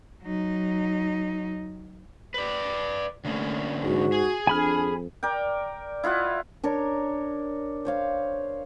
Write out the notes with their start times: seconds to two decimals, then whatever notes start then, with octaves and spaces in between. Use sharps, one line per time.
0.22 F#3 D#4
2.34 B4 D5
3.25 D3 A3 A#3 C#4
3.83 G#2 F#4
4.12 G#4
4.47 F2 D4 G#5 B5 F6
5.23 A#4 D5 G5
6.03 E4 F4 D#5 F#5
6.64 D4 A#4 C#5
7.85 C5 C#5 F5